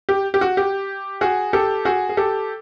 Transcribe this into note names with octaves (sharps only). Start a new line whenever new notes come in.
G4
G4
F#4
G4
F#4 G#4
G4 A4
F#4 G#4
G#4
G4 A4